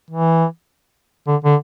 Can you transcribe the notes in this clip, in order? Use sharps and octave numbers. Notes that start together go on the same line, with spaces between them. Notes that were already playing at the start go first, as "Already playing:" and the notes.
E3
D3
D3